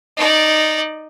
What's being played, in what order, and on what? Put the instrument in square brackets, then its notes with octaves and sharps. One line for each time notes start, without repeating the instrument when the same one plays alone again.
[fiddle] D#4 D5